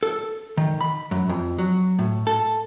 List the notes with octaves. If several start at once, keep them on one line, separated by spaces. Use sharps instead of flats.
A4
D#3
B5
F#2
F2
F#3
A2
A4